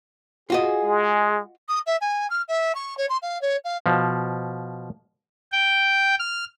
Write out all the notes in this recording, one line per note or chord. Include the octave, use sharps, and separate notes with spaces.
F4 F#4 G#4 D#5
G#3
D#6
E5
G#5
F6
E5
C#6
C#5
C6
F5
C#5
F5
B2 F3
G5
F6